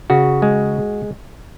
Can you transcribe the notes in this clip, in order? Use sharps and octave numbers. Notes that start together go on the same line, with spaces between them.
C#3 F#4
G#3